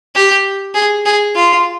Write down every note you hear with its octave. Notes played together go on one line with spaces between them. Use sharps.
G4
G#4
G#4
F4